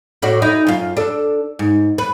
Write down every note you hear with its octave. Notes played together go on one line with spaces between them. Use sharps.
A2 F#4 D5
D#4 E4
F#2 F4
D4 A4
G#2
B4